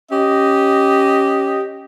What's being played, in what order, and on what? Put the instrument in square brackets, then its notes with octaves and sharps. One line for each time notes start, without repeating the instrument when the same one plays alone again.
[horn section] C#4 G4 D#5